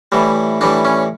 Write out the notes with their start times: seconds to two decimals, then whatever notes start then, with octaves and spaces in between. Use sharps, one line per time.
0.12 A2 E3 G3
0.61 A2 E3 G3 D4
0.85 C#4